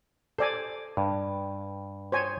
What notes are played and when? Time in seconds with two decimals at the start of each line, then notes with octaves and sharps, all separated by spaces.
0.38 A4 C5 D5 G#5
0.97 G2
2.12 C5 C#5 G#5